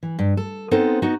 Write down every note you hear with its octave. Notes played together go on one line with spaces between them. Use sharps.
E3
G2
A4
B3 C4 D#4 A4 C5
B3 D#4 F#4